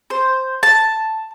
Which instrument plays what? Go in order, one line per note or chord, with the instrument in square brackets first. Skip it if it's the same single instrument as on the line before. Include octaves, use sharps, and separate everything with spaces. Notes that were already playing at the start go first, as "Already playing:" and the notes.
[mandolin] C5
A5